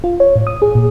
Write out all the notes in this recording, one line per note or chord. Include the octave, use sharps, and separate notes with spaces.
F4
C#5
A2
D#6
G#4
A#2